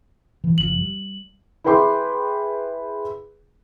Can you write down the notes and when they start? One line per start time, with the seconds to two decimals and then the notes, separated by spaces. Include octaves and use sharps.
0.44 E3 F#3
0.58 F#1 F3 F#7
0.78 G3
1.64 E4 G#4 B4 G5 C6 D6